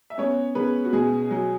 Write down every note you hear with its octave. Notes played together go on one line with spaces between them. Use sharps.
E5
B3 C#4 C#5
C#3 B3 B4
F#4
B2 G#4
F#3